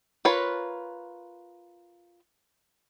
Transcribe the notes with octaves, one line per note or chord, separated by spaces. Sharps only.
F4 A#4 B4 C#5